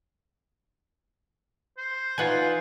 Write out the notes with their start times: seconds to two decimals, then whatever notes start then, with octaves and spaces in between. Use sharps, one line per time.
1.78 C5
2.18 E3 D#4 F4 B4 F#5 G#5